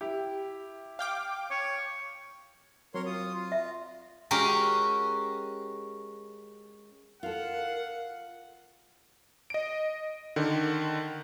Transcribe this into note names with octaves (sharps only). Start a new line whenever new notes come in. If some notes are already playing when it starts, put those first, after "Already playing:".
E4 G4
F5 G5 D6
C#5
F#3 C4 A#4 C#5 C6
F4 D#6
F4
E5
G#3 C#4 F#4 G4 A#4
F4 A4 A#4 F5 F#5
D#5 D7
D3 D#3